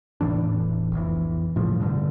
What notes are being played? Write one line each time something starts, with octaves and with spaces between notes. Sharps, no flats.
E1 A2 E3 D4
B1 F2 E3
A2 C#3 F3 G3
G2 B2 D3